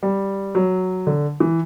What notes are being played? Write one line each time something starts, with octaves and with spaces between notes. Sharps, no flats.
G3
F#3
D3
E3